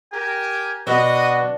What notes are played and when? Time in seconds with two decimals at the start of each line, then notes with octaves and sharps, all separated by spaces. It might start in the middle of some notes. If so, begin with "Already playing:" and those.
0.13 G4 A#4 G#5
0.87 B2 D4 F#4 D#5